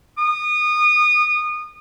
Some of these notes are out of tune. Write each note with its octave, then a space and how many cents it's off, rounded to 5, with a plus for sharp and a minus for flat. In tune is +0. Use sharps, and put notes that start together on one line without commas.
D#6 -25